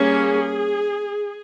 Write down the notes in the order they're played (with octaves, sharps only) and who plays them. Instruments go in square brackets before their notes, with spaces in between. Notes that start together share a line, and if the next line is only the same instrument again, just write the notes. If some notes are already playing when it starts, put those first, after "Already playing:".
Already playing: [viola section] G3 A#3 C#4 G#4